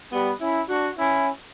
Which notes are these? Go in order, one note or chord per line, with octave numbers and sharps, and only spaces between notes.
G3 B3
C#4 E4
D4 F#4
C#4 E4